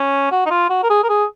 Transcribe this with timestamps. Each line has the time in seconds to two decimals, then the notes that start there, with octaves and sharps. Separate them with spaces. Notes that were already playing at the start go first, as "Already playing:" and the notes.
Already playing: C#4
0.32 F#4
0.46 D#4
0.50 F4
0.70 F#4
0.83 A#4
0.90 G#4
1.03 A#4
1.09 G#4